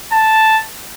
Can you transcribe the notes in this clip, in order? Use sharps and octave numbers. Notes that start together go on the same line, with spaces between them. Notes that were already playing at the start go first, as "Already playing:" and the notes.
A5